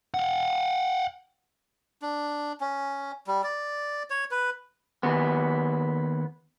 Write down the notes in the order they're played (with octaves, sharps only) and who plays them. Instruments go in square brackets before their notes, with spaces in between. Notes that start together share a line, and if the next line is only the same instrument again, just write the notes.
[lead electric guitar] F5 F#5
[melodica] D4
C#4
G3
D5
C#5
B4
[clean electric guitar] D#2 B3